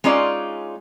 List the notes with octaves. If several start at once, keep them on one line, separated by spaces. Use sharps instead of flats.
G#3 C#4 D#4 F4 D5